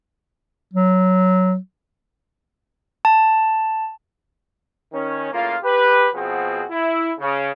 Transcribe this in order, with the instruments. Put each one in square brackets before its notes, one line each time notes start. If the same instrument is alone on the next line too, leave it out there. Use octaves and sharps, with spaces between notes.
[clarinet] F#3
[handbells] A5
[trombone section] D#3 C#4
A2 C#3 A#3 F4
G4 B4
B2 F3 B3 C4 F#4 G#4
E4
C#3